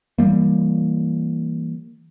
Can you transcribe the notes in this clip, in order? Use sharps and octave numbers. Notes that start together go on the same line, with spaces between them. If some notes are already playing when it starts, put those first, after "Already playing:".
E3 F#3 G3 A#3